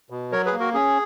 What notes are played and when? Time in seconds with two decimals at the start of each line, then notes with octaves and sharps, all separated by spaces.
0.10 B2
0.32 F#3 A#4 C#5
0.45 G#4 B4
0.52 A#3
0.60 F#4 A#4
0.74 C#4 G#4